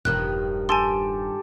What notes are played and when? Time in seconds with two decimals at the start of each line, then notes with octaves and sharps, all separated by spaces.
0.05 E1 G2 D#3 F3 F#6
0.69 G4 A4 G#5 A5 C6